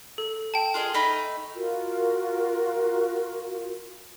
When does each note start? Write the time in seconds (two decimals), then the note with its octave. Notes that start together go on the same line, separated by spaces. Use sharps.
0.18 A4
0.54 G5 A5
0.74 F4 G#4 D#5
0.94 A3 D#4 B5
1.55 F4 F#4 A#4